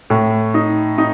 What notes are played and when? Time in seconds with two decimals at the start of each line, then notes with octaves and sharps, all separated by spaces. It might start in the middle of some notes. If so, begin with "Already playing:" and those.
0.10 A2
0.54 D#4
0.98 D#4